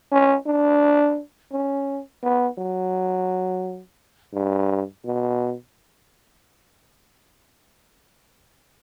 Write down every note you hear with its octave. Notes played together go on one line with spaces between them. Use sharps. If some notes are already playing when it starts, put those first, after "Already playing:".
C#4
D4
C#4
B3
F#3
G2
B2